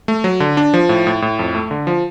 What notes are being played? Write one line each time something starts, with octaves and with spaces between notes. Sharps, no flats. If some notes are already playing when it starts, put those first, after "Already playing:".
A3
F#3
D3
D4
F3
A2
A2
A2
F2
A3
D3
F3